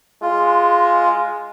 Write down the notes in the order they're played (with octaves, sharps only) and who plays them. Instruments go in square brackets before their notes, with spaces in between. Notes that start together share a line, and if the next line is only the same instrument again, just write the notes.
[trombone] G#3 [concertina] F4